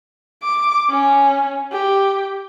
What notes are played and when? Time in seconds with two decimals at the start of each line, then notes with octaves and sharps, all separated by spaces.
0.43 D6
0.89 C#4
1.72 G4